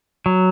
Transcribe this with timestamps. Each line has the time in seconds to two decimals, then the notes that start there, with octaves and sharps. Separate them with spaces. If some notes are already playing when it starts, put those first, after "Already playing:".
0.26 F#3